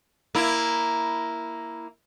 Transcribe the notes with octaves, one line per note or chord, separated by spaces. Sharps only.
A#3 E4